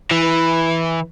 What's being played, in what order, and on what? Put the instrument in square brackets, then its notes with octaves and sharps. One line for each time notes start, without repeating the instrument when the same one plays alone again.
[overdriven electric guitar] E3